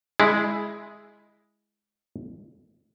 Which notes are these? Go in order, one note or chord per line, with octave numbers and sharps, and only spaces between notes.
G#3 E4 G#4